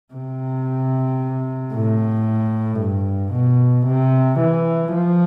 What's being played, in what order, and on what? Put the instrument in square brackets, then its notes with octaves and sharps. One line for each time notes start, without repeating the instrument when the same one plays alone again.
[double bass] C3
A2
G2
B2
C3
E3
F3